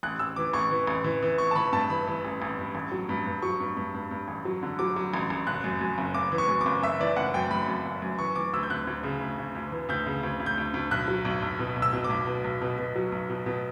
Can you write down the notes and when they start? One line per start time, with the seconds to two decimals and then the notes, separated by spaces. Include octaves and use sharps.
0.03 A1 F#6
0.19 A1 E6
0.36 E3 D6
0.53 A1 C#6
0.71 E3
0.87 A1
1.04 E3
1.23 E3
1.38 E3 C#6
1.51 A5
1.55 E3 B5
1.72 G2 A5
1.90 E3 B5
2.08 E3
2.25 A1
2.42 A1
2.59 G2
2.75 A1
2.91 F#3
3.09 G2
3.26 G2
3.42 F#3 C#6
3.60 G2
3.77 G2
3.94 G2
4.11 G2
4.28 A1
4.45 F#3
4.63 D3
4.79 F#3 D6
4.96 F#3
5.14 A1
5.30 A1
5.47 F#1 F#6
5.64 F#2
5.81 F#2
5.98 F#1
6.14 F#1 D6
6.32 E3
6.38 C#6
6.48 F#2
6.61 D6
6.66 F#1
6.83 F#1 E5
7.00 E3 D5
7.16 F#1 F#5
7.34 F#2 G5
7.51 F#2 B5
7.68 F#2
7.85 F#1
8.02 F#2
8.19 E3 C#6
8.35 E3 D6
8.53 D2 E6
8.63 G6
8.70 D2 F#6
8.87 D2
9.03 C#3
9.21 D2
9.38 D2
9.55 D2
9.72 E3
9.89 D2 G6
10.06 C#3
10.23 D2
10.40 D2
10.46 G6
10.58 D2
10.74 D2
10.91 B1 F#6
11.08 F#3
11.25 B1
11.42 B1
11.59 B2
11.76 B1
11.82 E6
11.93 B2
12.04 D6
12.10 B1
12.27 B2
12.44 B1
12.62 B2
12.78 B2
12.96 F#3
13.12 B1
13.30 B2
13.46 B2